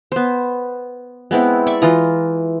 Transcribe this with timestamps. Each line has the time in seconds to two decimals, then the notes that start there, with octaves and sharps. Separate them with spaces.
0.12 B3 C5
1.31 G#3 B3 C4 E4
1.66 D5 E5 C#6 D6
1.82 E3 F4 D#5 A#5